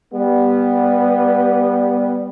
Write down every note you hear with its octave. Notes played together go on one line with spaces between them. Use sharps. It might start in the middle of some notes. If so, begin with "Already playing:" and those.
G3 B3